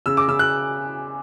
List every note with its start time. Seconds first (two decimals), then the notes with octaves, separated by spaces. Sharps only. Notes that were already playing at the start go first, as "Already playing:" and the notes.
0.06 C#3 E6
0.17 D6
0.28 C#3 E6
0.39 F#6